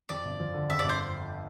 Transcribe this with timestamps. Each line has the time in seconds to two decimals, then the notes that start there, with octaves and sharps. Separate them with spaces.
0.09 F2 D5
0.25 G1
0.40 F3
0.54 D3
0.70 F2 E5
0.79 G1 D5
0.89 C5